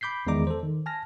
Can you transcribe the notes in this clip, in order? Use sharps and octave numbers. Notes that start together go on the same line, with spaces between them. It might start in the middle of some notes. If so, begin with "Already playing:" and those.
B5 D6 G6 B6 C7
E2 D#3 G#3 D5 A#5 D6
A4 C5
D#3
G#5 A5 F6 A#6